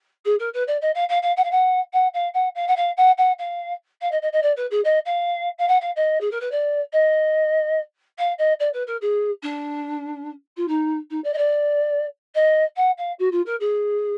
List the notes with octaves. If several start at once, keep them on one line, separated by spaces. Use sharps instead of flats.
G#4
A#4
B4
D5
D#5
F5
F5
F5
F#5
F5
F#5
F#5
F5
F#5
F5
F#5
F5
F#5
F#5
F5
F5
D#5
D#5
D#5
D5
B4
G#4
D#5
F5
F5
F#5
F5
D#5
G#4
A#4
B4
D5
D#5
F5
D#5
D5
B4
A#4
G#4
D4
F4
D#4
D#4
D5
D#5
D5
D#5
F#5
F5
F#4
F4
A#4
G#4